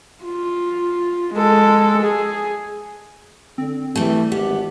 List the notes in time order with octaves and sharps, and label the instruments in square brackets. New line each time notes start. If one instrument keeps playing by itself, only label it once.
[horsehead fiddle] F4
G#3 A4
G#4
[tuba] D3 [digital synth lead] C4
[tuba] E3 [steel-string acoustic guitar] G3 A3
[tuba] G#1 [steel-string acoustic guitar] B3 [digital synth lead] G4